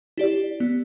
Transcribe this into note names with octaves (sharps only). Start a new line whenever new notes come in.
E4 G4 D5
B3